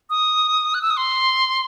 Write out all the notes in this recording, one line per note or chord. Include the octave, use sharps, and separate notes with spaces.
D#6
F#6
E6
D#6
C6